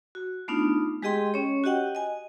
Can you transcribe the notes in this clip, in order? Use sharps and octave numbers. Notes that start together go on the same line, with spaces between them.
F#4
A3 B3 D4 D#4 F4
G#3 G4 G#4 D#5 G5 C6
C#4 C#5
F#4 G4 D#5 F#5 G5
D#5 G#5